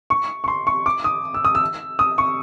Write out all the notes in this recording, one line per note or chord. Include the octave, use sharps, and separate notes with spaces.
C#6
C#6
C6
C#6
D6
D#6
E6
D#6
E6
D#6
C#6